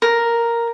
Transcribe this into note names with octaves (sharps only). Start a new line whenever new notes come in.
A#4